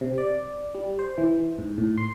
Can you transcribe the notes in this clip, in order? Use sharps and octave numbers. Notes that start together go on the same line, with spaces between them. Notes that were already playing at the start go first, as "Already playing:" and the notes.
C3
D5
G3
C5
E3
G#2
A2
C6